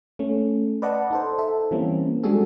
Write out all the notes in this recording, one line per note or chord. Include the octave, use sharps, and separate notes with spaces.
A3 C#4
B4 D5 D#5 F#5 A5
D#4 A4 C5
A4 E5
E3 G3 A#3 C4 C#4
G3 G#3 D4 F#4 G#4 A4